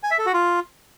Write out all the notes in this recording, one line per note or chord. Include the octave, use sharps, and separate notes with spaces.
G#5
E5
A4
F#4
F4